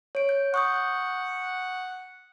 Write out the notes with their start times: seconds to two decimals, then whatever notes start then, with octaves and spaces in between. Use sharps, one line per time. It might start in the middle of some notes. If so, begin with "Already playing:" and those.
0.15 C#5 D7
0.29 G6
0.54 F#5 C#6 D#6 G6